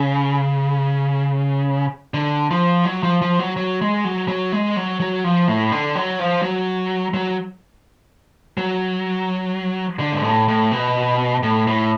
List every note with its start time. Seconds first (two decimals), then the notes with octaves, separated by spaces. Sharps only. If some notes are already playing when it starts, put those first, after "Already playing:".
Already playing: C#3
2.14 D3
2.51 F3
2.85 F#3
3.03 F3
3.22 F3
3.39 F#3
3.57 F#3
3.82 G#3
4.05 F#3
4.28 F#3
4.52 G#3
4.77 F#3
5.00 F#3
5.24 F3
5.48 A2
5.72 D3
5.95 F#3
6.20 F3
6.42 F#3
7.14 F#3
8.57 F#3
10.00 D3
10.13 G#2
10.24 A2
10.48 A2
10.72 B2
11.43 A2
11.67 A2